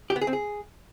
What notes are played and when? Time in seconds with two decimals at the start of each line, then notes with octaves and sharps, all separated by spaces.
0.10 G4
0.16 B3
0.21 G#4
0.27 C4
0.33 G#4